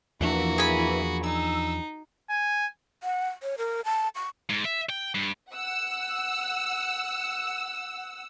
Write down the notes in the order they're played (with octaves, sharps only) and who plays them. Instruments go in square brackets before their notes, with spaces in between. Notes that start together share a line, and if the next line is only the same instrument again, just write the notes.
[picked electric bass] E2 F3 D4 [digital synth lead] E3 [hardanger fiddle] A#3 F#4
[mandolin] G#4 B5
[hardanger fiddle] D#4 [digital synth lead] E6
[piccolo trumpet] G#5
[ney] F#5
C#5
A#4
A5
C#6
[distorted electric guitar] G#2
E5
G5
G2
[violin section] F#5 E6